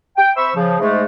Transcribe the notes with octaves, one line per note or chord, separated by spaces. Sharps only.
G5
C4 C5 E5 B5 C#6 E6
C#3 F3
G#2 G#3 A3